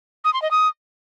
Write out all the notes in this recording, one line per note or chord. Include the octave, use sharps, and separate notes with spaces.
D#6
C6
D#5
D#6